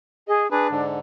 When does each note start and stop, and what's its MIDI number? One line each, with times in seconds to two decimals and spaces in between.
0.28 0.50 68
0.28 0.43 75
0.51 0.87 62
0.51 0.67 68
0.51 0.67 71
0.71 0.99 44
0.71 0.99 50